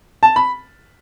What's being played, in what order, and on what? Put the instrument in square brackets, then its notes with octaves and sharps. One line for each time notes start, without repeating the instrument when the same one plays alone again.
[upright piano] A5
B5